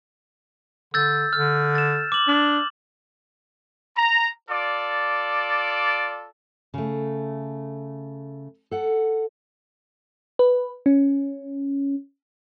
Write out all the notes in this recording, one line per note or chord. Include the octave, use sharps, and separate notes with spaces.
D3 E6 G6 A6
D3 F6
A6 E7
D6 F#7
D4
A#5
F4 A4 D5
C#3 A3
A4 F#5
B4
C#4